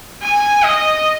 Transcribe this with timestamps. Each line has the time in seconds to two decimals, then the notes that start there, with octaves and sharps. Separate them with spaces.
0.23 G#5
0.64 D#5